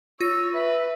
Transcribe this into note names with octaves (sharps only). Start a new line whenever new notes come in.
F4 C#5 E6 A#6
B4 E5